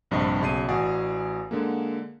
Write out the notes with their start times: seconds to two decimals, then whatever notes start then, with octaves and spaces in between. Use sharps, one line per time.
0.11 A#1 G2 C3 G3 C5 D#5
0.41 B1 C#3 A5 C6 C7 D#7
0.69 A1 F#4 D5 F#5 G#5 D#6
1.51 D3 G#3 A#3